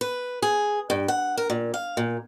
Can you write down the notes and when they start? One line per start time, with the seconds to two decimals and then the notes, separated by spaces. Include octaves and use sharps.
0.01 B4
0.42 G#4
0.90 G2
1.08 F#5
1.37 A#4
1.50 A#2
1.74 F5
1.97 A#2